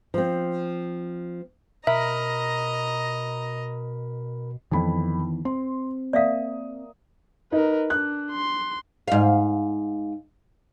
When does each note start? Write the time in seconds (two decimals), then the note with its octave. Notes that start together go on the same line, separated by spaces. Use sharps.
0.14 F3 C4
1.87 B2 A#4 D#5 E5 A#5 B5
4.71 F2 D#3 E3 B3 B5
5.45 C4 C6
6.13 A#3 D5 E5 F5 D#6
7.52 D#4 A#4 B4
7.90 D4 F#6
8.32 C6
9.08 G#2 F5